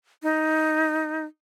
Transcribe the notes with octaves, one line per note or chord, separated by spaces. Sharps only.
D#4